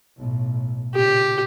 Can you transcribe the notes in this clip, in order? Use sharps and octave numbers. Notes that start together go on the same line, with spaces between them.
B1 A2
A#2 C#3 G4